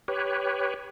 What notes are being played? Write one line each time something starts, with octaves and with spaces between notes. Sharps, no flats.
G4 B4 C#5